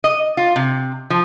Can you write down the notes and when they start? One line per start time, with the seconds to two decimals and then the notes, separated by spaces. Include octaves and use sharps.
0.04 D#5
0.37 F4
0.56 C3
1.10 F3